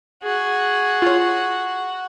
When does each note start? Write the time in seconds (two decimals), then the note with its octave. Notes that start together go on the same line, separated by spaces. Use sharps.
0.23 F#4 G#4
1.02 F4 C#5